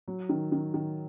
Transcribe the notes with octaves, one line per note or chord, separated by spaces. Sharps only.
F#3
D#3
D#3
D#3